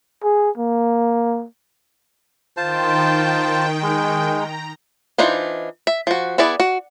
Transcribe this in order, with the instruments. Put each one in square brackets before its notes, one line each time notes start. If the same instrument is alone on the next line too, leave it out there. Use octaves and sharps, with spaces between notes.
[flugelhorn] G#4
A#3
[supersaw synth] D#3 G5 [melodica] F4 C5 A5
[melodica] G#3
[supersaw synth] A#5
[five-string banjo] E3 D4 D#4 F4 C5
E5
F3 F#4
B3 E4 G#4 B4 D5
F#4